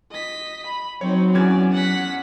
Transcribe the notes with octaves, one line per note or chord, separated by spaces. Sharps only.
D#5 B6
B5
F#3 C4 D#4 C#5
E2 C#4 D5 G#6
F#5 B6